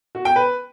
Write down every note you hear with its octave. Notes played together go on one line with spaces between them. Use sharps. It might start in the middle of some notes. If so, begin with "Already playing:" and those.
F#4
G5
B4